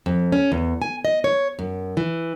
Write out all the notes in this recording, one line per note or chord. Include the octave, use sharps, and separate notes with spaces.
F2
C#4
E2
G#5
D#5
C#5
F#2
E3